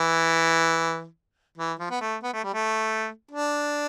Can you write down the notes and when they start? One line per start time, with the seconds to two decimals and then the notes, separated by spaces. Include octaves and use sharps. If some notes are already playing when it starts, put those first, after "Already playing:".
Already playing: E3
1.58 E3
1.79 F3
1.90 B3
2.01 A3
2.23 B3
2.33 A3
2.44 G3
2.54 A3
3.31 D4